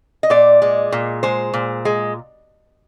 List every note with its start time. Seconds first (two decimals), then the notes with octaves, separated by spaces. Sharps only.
0.23 D#5
0.30 A#2 D5
0.62 G#3
0.92 A#2
1.23 G#3 C5
1.54 A#2
1.85 G#3